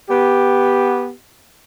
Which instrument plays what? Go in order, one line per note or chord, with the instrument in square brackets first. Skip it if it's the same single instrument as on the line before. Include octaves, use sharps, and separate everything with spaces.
[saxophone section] B3 G4